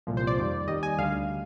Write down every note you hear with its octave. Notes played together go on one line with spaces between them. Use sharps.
C2 A#2 F3
C5
D5
F2 D#3 G3
D#2 D#3 G3 D#5
G#5
D2 D3 G3 F5